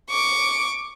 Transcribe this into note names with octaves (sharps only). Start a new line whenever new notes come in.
C#6 D6